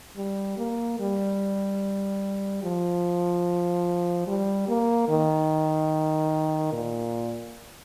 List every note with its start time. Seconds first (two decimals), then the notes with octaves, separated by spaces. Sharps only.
0.17 G3
0.58 A#3
0.99 G3
2.63 F3
4.27 G3
4.68 A#3
5.09 D#3
6.73 A#2